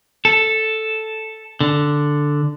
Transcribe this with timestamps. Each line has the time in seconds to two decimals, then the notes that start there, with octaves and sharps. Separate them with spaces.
0.25 A4
1.61 D3